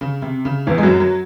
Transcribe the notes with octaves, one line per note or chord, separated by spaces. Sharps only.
C#3
C3
C#3
E2 E3
G#3
F#2 F#3
F#3